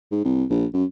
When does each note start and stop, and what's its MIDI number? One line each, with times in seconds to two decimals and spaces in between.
0.12 0.24 44
0.24 0.44 36
0.50 0.65 34
0.73 0.84 42